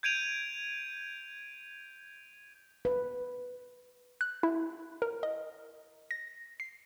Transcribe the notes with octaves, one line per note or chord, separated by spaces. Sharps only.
G6 G#6 D7 D#7 F7
B4
F#6
E4
A#4
D#5
A#6
C7